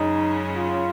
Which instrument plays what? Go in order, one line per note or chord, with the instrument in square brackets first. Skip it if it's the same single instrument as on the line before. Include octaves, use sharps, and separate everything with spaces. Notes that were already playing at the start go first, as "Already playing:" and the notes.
Already playing: [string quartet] F#2 C#3 G#3 C#4 [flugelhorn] D#4
[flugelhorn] F4